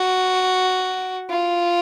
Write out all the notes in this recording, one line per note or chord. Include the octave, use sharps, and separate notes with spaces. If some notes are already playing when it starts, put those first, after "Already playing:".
Already playing: F#4
F4